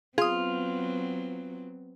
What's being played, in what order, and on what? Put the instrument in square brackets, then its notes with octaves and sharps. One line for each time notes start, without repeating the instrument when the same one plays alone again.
[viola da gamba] F#3 B3 C4 [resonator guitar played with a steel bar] F4 [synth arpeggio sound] G#4 D#6